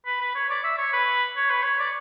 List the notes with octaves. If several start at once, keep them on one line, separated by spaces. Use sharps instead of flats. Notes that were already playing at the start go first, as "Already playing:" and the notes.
B4
B4
C#5
D5
E5
C#5
B4
C#5
B4
C#5
D5